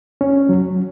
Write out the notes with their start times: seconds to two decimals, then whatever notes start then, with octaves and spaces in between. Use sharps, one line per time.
0.21 C#4
0.49 F#3